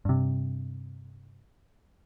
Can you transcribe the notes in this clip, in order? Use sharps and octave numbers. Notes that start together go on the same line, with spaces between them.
G2 C3